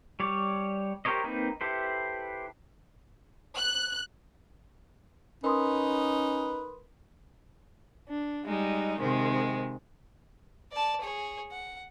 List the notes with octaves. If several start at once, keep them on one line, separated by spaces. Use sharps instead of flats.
G3 C#5 D5
G4 A#4 C5 C#5 D#5
A#3 C4 D#4 B4
E4 G4 A4 B4 C5
F#6
C#4 D#4 A#4 B4 C6 D#6
D4
G3 G#3 D#4
C3 D#3 G#3 C4
D5 A5
G#4 C#5
F#5